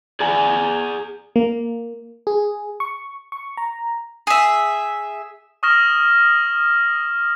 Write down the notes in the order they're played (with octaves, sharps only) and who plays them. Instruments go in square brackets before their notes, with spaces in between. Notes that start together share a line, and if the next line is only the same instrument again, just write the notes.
[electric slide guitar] G#4 D5 F#5 G#5
[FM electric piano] A#3
G#4
C#6
C#6
A#5
[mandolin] G#4 E5
[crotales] C#6 D#6 F6 A#6 E7